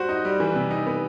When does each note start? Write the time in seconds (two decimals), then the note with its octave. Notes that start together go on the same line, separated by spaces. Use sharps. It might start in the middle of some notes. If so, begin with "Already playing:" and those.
Already playing: G3 F#4 C5
0.09 D#4
0.25 G3
0.40 E3
0.55 C3
0.71 D#4
0.86 B3